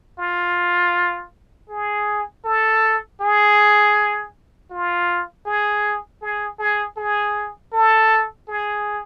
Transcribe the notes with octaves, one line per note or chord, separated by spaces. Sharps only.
F4
G#4
A4
G#4
F4
G#4
G#4
G#4
G#4
A4
G#4